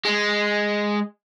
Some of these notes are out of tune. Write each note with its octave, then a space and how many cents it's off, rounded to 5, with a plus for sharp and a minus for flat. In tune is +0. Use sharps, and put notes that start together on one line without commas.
G#3 -5